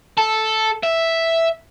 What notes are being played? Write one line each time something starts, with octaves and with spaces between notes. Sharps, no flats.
A4
E5